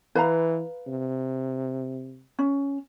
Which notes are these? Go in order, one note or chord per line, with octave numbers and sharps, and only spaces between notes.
E3 B4 F5 A#5
C3
C#4